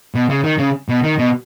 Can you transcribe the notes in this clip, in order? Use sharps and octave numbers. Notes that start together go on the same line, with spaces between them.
B2
C#3
D#3
C#3
B2
D#3
B2